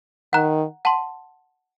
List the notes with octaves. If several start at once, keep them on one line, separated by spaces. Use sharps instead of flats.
D#3 F#5 A#5 F#6
F#5 A5 C6